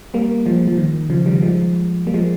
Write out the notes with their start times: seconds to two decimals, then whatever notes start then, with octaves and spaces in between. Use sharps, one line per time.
0.14 G3 A#3
0.46 F3 G#3
0.68 F3
0.78 D#3
1.10 C#3 F3
1.26 D#3 G3
1.42 F3 G#3
2.07 G3 A#3
2.14 F3 G#3